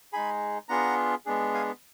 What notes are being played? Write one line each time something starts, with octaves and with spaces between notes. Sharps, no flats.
G#3 D#4 G#4 G#5 B5
B3 D4 F4 G#4 F#5 A#5
G#3 B3 D4 G#4
F5 G#5